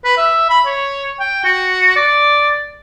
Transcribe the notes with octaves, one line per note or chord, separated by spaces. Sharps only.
B4
E5
B5
C#5
G5
F#4
D5